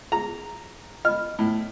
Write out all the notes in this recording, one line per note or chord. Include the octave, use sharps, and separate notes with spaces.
G#4 A#5
D#5 B5 F6
A2